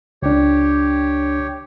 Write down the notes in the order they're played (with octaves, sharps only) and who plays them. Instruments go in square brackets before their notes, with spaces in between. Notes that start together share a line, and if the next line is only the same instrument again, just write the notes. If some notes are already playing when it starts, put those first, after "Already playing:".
[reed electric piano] C#2 D4 [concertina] G4 C#5